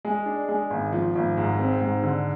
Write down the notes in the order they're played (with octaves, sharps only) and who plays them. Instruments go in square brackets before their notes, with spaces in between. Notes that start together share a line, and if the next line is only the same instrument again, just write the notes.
[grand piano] G#3
D4
G#3
G#1
F3
G#1
G#2
C4
G#2
D3